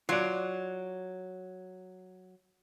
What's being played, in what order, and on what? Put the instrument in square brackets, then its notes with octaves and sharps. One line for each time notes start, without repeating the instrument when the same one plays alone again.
[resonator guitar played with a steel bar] F#3 [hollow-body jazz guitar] F4 D5